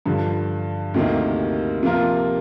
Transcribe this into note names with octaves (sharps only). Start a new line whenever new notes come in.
G2 D3 F3
D2 C3 D#3 A#3
C3 F3 A#3 F4 A#4